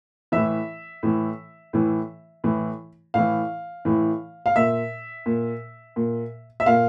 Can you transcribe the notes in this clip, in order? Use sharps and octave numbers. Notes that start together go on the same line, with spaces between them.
A2 E3 E5
A2 E3
A2 E3
A2 E3
A2 E3 F5
A2 E3
F5
A#2 E5
A#2
A#2
E5
A#2 F5